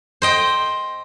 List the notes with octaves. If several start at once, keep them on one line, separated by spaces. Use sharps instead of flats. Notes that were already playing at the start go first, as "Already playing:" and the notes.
C5 D#5 G5